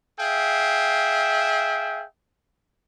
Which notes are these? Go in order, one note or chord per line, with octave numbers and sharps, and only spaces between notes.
G#4 E5 F5 G5